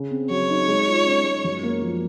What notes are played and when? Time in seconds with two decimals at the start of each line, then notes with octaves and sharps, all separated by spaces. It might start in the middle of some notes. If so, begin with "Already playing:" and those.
Already playing: C#3
0.11 C4
0.30 F#3 C#5
0.49 D#4
0.68 G#3
0.88 F4
1.06 C#4
1.25 G#3
1.44 F#2
1.63 A#3
1.82 F3